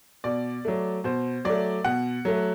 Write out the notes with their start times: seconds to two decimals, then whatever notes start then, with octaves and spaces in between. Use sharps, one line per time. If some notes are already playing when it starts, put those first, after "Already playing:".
0.24 B2 D5
0.65 F#3 A3
1.04 B2 C5
1.45 F#3 A3 D5
1.85 B2 F#5
2.25 F#3 A3